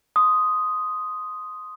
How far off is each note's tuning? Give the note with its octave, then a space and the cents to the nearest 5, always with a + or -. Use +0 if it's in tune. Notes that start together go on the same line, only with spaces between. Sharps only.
C6 +0 D#6 +0